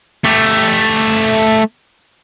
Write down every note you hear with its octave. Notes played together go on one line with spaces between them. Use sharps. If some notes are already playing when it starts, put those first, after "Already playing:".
A3 G4